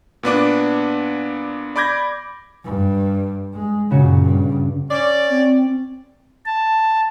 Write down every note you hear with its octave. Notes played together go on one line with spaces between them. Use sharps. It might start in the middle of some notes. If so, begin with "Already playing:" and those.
A#2 B3 D4 D6
D5 B5 D6 G6 G#6 A#6
G2
G#3
F#2 A#2 C#3 F#4
G2
C#4 D5
C4
A5